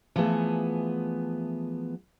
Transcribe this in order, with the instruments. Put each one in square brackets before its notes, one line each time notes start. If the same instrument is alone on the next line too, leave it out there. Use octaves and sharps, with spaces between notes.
[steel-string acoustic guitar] E3 F3 A3 B3 G#4